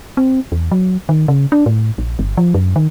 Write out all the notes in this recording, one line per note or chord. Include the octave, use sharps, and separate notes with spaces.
C4
E2
F#3
D#3
C#3
D4
A2
A#1
G1
F3
F#2
D#3